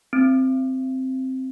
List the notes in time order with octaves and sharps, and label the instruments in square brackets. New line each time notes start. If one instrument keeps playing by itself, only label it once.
[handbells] C4